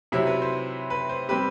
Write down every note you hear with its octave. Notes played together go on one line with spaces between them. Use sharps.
C3 F#3 C4 E4
B4
C5
B4
C5
G3 C4 G4 B4